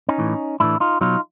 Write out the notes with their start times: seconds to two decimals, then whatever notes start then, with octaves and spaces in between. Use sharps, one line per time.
0.09 C#4 D#4
0.19 A2 E3
0.60 A2 E3 D4 E4
0.80 D#4 F4
1.01 B2 F#3 D#4 F4